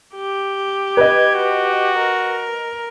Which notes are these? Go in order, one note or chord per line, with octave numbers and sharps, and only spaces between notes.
G4
B4 D#5 G#6
F#4
A#4